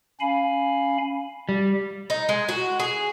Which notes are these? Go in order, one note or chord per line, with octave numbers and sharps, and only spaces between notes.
C#4 F5 G#5 B5
G3
D#4
G#3
F#4
G#4